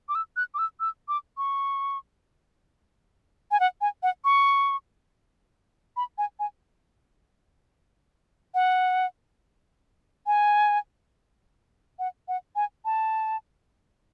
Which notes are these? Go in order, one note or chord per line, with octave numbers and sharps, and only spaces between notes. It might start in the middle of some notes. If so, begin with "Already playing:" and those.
D6
E6
F#6
D6
E6
E6
D6
C#6
G#5
F#5
G#5
F#5
C#6
B5
G#5
G#5
F#5
G#5
F#5
F#5
G#5
A5